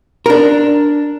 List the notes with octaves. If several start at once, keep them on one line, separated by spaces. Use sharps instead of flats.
D4 A#4